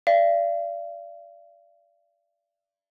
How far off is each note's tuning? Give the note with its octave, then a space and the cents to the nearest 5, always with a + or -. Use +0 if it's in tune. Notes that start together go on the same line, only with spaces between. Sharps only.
D5 -5 F5 -45